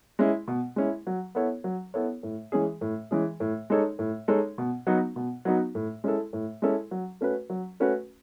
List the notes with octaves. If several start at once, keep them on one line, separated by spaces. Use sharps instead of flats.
G#3 C#4 E4
B2
G#3 C#4 E4
F#3
B3 E4 A4 C#5
F#3
B3 E4 A4 C#5
A2
E3 G#3 C#4 G#4
A2
E3 G#3 C#4 G#4
A2
G#3 D#4 A4 C#5
A2
G#3 D#4 A4 C#5
B2
F#3 B3 D#4 F#4
B2
F#3 B3 D#4 F#4
A2
G#3 C#4 E4 A4
A2
G#3 C#4 E4 A4
F#3
A3 C#4 F#4 B4
F#3
A3 C#4 F#4 B4